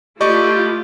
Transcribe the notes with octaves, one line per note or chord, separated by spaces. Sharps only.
A3 E4 F4 G4 D5 D#5 C#6